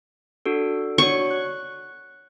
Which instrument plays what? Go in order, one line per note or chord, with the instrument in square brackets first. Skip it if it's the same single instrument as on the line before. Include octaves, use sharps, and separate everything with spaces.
[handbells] D4 F#4 A4
[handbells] D4 F#4 C#5 [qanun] C#6
[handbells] F#6